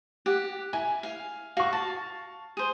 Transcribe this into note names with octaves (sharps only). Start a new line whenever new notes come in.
G4 F#5
E4 G#5
F5
F#4 F5 C#6
A5
G#4 C5